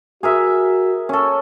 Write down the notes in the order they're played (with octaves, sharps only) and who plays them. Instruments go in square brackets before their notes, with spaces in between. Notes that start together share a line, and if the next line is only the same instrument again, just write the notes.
[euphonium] F#4 [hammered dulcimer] G#4 A#4 E5
[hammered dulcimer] C#4 A4